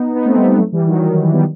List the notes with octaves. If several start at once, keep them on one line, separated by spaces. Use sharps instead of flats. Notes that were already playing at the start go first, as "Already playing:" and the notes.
Already playing: B3 D#4
B3 D#4
A3 C4
G3 B3
G3 B3
F#3 A3
E3 G3
D#3 F#3
D#3
E3
G3 B3